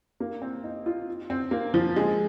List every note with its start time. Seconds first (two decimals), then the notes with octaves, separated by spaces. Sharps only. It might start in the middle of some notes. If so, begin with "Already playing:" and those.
0.20 A#3
0.42 C4
0.64 D#4
0.86 F4
1.30 C4
1.51 A#3
1.74 F3
1.96 G#3